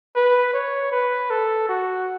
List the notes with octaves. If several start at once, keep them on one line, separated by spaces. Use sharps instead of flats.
B4
C#5
B4
A4
F#4